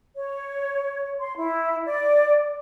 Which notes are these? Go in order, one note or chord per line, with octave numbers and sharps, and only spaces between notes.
C#5
C6
E4
D5